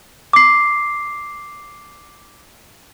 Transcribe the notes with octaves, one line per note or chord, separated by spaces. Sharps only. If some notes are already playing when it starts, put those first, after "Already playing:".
D6 C7